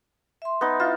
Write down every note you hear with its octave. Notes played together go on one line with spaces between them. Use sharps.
E5 C6
B3 D#4
E4 F4 E5